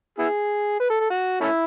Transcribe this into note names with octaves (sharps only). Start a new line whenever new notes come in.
B3 E4 G#4
B4
A4
A4
F#4
A3 C#4 E4